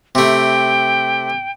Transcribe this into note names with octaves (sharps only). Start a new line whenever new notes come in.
C3 A3 G5